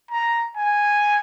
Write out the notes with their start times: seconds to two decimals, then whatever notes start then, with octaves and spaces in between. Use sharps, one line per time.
0.11 A#5
0.56 G#5